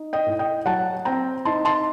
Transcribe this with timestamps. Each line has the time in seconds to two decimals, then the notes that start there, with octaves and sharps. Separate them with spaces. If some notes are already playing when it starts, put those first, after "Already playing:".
Already playing: D#4
0.13 D#5 G5
0.26 A2
0.39 D#5 G5
0.66 F#3 F#5 A5
1.05 C4 G5 A#5
1.45 D#4 A5 C6
1.65 A5 C6